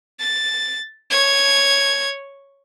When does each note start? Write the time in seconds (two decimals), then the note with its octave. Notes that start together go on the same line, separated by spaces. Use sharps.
0.20 A6
1.10 C#5 G#6